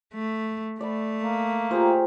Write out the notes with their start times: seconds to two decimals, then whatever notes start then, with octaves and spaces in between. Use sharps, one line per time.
0.14 A3
0.81 A3 D5 E5 B5
1.23 A#3
1.71 F4 G4 G#4 C5 A#5